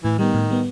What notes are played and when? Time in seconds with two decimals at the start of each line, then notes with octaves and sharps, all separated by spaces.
0.04 A2 E3
0.19 D#3 G3 B3
0.34 A2
0.50 G3 B3